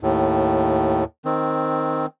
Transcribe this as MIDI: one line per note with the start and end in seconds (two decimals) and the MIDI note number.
0.01 1.04 39
0.01 1.04 45
1.25 2.06 51
1.25 2.06 60